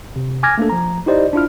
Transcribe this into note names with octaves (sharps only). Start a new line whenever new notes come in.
C3
G#5 D6 F6 G#6 A#6
A3 A#3 D4 A4
F3 A#5
D#4 E4 G4 C5 D5 D#5
D4 E4 F4 F6